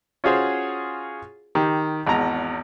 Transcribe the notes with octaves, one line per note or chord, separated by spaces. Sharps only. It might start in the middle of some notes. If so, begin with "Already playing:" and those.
C#4 F4 F#4 G#4 C5 C#5
D#3 G4
G#1 E2 A#5